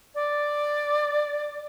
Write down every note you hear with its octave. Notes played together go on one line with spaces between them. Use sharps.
D5